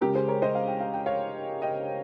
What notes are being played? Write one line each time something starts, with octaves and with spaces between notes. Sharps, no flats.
C#2 C#3 G#3 C#4 G4 A#4
G#4 C5
A#4 C#5
C5 D#5
F5
G5
F5
G5
C#5 F5
D#5 G5